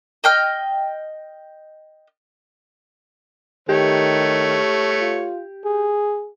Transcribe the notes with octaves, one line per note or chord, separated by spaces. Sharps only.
D#5 G5 F6
D#3 A3 G4 C#5
F4
G#4